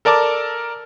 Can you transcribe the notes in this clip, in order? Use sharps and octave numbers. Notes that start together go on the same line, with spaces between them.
A4 A#4 D5 A5 D6